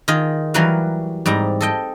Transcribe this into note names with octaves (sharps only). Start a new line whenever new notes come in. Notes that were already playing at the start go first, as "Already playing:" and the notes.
D#3 F4 G#4 D#5
E3 F#3 G3 A#4 B4 F5
G#2 G3 C4 A#5
A4 D#5 G5